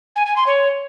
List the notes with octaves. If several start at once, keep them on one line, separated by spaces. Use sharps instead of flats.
G#5
G#5
C6
C#5